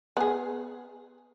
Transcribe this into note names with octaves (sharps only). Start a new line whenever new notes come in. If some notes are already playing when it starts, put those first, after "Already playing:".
B3 G#4